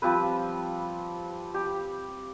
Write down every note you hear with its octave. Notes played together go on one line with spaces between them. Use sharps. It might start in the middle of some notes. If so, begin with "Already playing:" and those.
F3 G3 C4 B4
G4